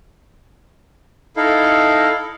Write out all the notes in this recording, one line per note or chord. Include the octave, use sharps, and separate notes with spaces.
D#4 E4 A4 F5